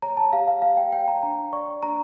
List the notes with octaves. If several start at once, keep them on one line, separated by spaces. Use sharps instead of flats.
C#5 A#5
A5
G4 F5
F5
G4 F5
G5
C#5 G5
A#5
D4 A#5
D5 C#6
D4 A#5